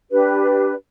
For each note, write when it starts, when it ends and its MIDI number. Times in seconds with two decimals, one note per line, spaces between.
0.11 0.73 62
0.11 0.73 67
0.11 0.73 71